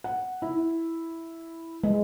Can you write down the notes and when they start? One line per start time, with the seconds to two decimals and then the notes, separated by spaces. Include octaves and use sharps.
0.04 F#5
0.42 E4
1.84 G#3